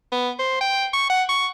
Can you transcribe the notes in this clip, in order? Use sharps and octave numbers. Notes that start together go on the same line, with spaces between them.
B3
C5
G5
C#6
F#5
C#6